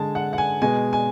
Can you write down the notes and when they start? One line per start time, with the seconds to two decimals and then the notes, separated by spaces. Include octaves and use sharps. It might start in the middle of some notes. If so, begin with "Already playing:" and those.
Already playing: D3 G#3 G#5 A5
0.15 F#5
0.33 F#5
0.38 G#5
0.62 B2 G#3 G#5
0.93 G#5